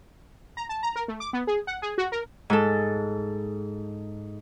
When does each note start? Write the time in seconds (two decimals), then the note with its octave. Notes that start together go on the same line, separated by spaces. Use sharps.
0.57 A#5
0.69 A5
0.83 A#5
0.96 A#4
1.08 A3
1.20 D6
1.33 B3
1.47 G#4
1.67 F#5
1.82 G#4
1.98 F#4
2.12 A#4
2.50 G#2 A4